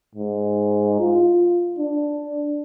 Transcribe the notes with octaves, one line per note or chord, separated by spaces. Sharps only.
G#2
F4
D4